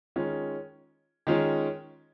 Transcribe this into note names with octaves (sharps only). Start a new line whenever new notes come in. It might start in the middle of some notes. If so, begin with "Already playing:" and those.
D#3 G#3 C#4 F4
D#3 G#3 C#4 F4